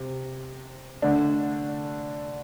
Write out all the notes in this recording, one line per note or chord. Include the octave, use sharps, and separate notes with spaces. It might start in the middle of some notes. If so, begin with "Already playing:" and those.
Already playing: C3
D3 A3 D4